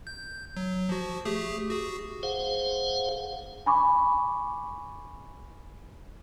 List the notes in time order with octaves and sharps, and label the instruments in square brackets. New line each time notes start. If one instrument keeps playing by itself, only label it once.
[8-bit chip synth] G6
F#3
F3 F#4
A3 G4 G#4
F#4 G#4
[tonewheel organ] G#4 C5 F5 F#5
[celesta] G#5 B5 C#6 D6